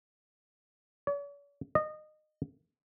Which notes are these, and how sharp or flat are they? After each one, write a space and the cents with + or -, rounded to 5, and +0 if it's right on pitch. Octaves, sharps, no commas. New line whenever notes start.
C#5 +45
D#5 -25